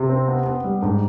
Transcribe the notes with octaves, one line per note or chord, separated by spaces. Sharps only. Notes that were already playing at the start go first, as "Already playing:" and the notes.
Already playing: C3
C4
B3
B3
G3
G#2